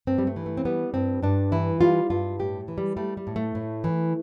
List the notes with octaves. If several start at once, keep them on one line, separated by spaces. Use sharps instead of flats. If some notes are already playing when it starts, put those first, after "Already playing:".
G2 C4
G3
A3
E3
A3
C4
G3 B3
G2 C4
G2 D4
E3 E4
G3 F4
G2 F4
A2 G4
E3
G3
G3 A3
G3
A2
A3
A2
E3